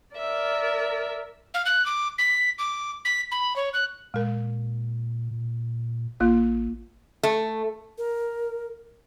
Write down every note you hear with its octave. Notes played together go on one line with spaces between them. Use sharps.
A#4 D5 E5
F5
F#6
D6
B6
D6
B6
B5
C#5
F#6
A#2 G#3 A#4
A#2
A1 A#3 F4
A3
A#4